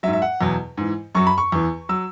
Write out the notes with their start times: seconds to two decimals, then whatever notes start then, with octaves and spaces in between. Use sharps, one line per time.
0.03 F#3 E5
0.08 G#2
0.13 E5
0.22 F#5
0.41 E2 B2 F#3
0.77 G#2 E3
1.15 F#2 F#3 C#6
1.27 B5
1.38 C#6
1.52 E2 E3
1.89 F#3 E6